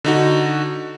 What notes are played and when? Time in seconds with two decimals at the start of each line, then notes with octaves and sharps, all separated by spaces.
0.04 D3 D#4 F#4